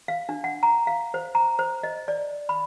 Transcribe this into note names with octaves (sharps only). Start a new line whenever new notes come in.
F5
D4
F#5
A#5
F5
C5
A#5
C5
D#5
D5
B5